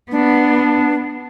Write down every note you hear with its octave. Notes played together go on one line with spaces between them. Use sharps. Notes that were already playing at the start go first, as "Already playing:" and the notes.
B3 D4